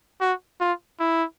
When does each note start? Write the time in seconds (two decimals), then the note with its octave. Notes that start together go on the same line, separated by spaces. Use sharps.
0.21 F#4
0.60 F4
1.00 E4